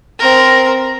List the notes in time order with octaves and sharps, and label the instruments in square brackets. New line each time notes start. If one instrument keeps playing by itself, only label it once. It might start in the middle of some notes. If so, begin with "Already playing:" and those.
[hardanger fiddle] C4 A#4